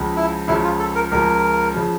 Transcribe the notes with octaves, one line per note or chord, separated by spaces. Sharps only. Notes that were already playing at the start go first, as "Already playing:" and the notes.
Already playing: C#2 C#3 F3
E4
C#2 C#3 F3 E4
F4
A4
A#4
C#2 C#3 F3 A#4
C#3 F3